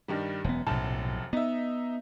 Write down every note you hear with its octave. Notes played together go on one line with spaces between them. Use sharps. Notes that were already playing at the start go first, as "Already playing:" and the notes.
G2 D#3 G3
E1 F#2 B3
F1 B1 F#2 A2 A5
B3 D#4 E5